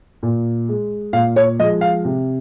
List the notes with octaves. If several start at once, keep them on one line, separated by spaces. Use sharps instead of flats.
A#2
G#3
A#2 F5
C#5
F3 G#3 D#5
F5
C3